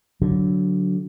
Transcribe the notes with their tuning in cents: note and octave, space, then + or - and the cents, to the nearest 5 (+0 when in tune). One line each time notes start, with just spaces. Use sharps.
D3 -20 F#3 +0